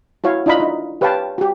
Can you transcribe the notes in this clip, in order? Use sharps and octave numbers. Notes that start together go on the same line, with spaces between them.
E4 F#4 C#5 F5
D4 E4 F4 D#5 A#5 B5
D#4
G4 B4 C#5 F5 G5 A5
F#4 G4